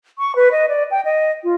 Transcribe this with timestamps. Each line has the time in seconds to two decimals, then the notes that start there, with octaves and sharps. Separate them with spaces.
0.18 C#6
0.35 B4
0.51 D#5
0.68 D5
0.91 G5
1.04 D#5
1.43 F4